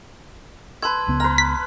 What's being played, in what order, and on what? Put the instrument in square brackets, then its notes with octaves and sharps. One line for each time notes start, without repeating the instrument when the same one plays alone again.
[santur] B4 E6 [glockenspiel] A5 C6 G#6
[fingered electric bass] C#2 C#3 B3
[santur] B4 A#5 [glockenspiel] F6
[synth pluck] B6